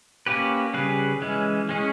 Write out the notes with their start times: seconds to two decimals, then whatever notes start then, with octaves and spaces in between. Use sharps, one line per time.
0.26 A#3 C#4 G4 B4
0.73 C#3 G3 C#4 G#4 B4
1.22 E3 G#3 C#4
1.69 G#3 C#4 G#4